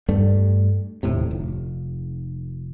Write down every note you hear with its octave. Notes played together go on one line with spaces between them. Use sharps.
G2 G3 A3
D#1 D2 A2 C3
F1